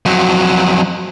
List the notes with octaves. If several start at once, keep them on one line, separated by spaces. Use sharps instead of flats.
F2 F#3